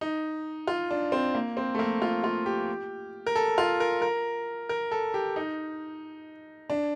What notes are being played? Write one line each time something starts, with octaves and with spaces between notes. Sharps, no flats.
D#4
F4
D4
C4
A#3
C4
A3
A#3
F4
F4
G4
A#4
A4
F4
A#4
A#4
A#4
A4
G4
D#4
D4